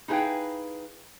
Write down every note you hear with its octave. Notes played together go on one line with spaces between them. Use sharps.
D#4 E4 G#4 B4 F5 G5